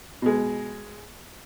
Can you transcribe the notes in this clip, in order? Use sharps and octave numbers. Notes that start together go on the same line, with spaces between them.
B2 G#3